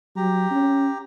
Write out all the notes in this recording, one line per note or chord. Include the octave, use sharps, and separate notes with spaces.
F#3 G4 A#5
C#4